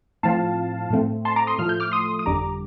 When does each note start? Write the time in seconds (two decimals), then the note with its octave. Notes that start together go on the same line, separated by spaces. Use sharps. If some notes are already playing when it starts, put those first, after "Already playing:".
0.23 A2 F3 C4 F5 A5
0.90 A2 A3 C4
1.25 A5 C6
1.36 A#5 D6
1.47 C6 D#6
1.58 A2 F3 A3 F6
1.69 G6
1.80 D6 F6
1.92 C6 D#6
2.19 D#6
2.26 G1 F2 D3 G3 A#5 D6